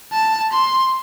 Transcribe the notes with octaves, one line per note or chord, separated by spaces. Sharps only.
A5
C6